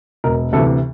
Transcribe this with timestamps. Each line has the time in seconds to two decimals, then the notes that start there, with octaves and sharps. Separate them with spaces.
0.24 E1 A#4
0.53 D2 C3 E3 A4